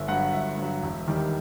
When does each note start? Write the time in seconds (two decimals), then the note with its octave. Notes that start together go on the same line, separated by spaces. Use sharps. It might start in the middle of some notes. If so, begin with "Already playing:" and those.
Already playing: G1 E5
0.08 G2 F#3 F#5
0.33 G1 E5
0.58 G2 F#3
0.82 E1
1.08 D#2 D#3 G3